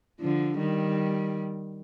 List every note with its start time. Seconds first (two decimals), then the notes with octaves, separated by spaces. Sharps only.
0.21 D3 F3
0.59 D#3 G3